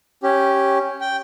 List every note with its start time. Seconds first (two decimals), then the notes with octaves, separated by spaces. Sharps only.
0.23 C#4 G4
1.01 G5